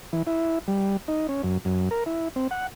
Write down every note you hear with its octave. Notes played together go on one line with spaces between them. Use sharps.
E3
E4
G3
D#4
C#4
F#2
F#2
A#4
E4
C4
F#5